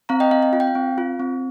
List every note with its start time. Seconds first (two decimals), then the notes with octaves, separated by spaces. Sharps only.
0.09 C4 F5 A#5
0.20 D#5 G5
0.31 C4 F5
0.42 F5
0.53 F4 F5
0.60 G5
0.67 F5
0.75 C4
0.98 F4
1.20 C4